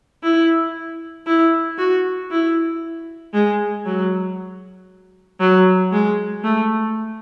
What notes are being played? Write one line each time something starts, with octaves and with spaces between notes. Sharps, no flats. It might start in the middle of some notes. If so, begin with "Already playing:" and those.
E4
E4
F#4
E4
G#3
F#3
F#3
G#3
A3